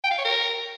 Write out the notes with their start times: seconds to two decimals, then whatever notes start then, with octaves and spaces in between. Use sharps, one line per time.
0.04 G5
0.11 F5
0.18 C#5
0.25 A#4